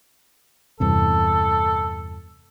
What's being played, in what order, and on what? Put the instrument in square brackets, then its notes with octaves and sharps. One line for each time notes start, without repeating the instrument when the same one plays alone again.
[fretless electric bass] E2 G2 C3 [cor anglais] A4